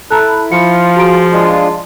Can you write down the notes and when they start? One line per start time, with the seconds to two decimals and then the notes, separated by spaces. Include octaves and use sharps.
0.11 E4 A4 A#5 F#6
0.52 F3 F4 C#7
0.96 F#4 G#4 A#5 D7
1.32 G#3 D4 F4 C6